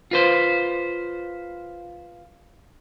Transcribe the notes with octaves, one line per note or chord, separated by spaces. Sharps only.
F4 B4 C5